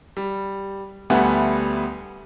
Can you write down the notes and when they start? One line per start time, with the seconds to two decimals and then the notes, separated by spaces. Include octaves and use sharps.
0.17 G3
1.10 D2 G3 A3 B3 F#5 G#5